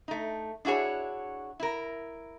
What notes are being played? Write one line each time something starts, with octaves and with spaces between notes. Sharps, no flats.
A3 D#4
D4 E4 F#4 G#4 C#5
E4 A#4